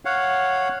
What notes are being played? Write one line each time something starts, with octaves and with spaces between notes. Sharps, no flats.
C#5 F5 F#5